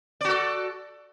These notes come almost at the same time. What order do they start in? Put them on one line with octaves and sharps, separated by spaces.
D5 F#4 A4